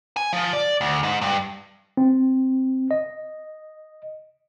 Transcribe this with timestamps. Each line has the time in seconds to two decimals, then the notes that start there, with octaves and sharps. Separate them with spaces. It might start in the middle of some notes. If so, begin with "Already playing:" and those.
0.16 G#5
0.33 F3
0.53 D5
0.81 D2
1.03 G#2
1.22 G2
1.97 C4
2.91 D#5